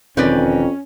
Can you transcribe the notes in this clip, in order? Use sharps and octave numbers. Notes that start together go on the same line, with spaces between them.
E1 F2 B2 D#3 C4 C#4 B4 D5